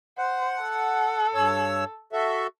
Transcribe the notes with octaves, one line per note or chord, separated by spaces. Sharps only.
C5 F#5
A4
G2 C#5 E6
F#4 A4 E5